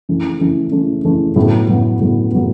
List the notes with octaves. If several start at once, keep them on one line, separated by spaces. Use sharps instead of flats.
C#3 E3 A3
C#3 E3 A3
C#3 E3 A3
C#3 E3 A3
A2 F#3 B3
A2 F#3 B3
A2 F#3 B3
A2 F#3 B3